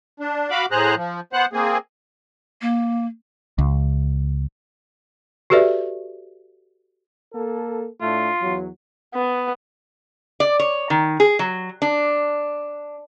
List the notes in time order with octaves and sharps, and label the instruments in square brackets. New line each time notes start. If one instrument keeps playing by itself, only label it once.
[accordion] D4
F#4 F5 B5 D6
A2 G#4 C5 A#5 F#6
F3
B3 C5 F#5 F#6
A#3 C4 G#4
[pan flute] A#3
[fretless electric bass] C#2
[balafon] F#4 G4 A4 B4 D5 E5
[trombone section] A#3 A4
[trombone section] A2 A3 D4 [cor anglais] F4
[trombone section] E2 F#3
[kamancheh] B3
[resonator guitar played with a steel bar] D5
C#5
D#3
G#4
F#3
D4